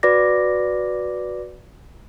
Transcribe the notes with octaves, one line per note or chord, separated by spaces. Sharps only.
F#4 B4 D5 D6 A#6